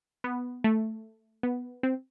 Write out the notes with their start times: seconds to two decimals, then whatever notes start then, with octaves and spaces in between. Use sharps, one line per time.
0.24 B3
0.64 A3
1.43 B3
1.83 C4